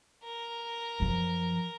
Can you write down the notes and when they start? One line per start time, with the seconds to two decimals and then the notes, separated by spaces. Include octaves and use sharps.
0.23 A#4
1.00 F#2 F3